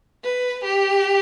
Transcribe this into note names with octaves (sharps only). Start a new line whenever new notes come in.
B4
G4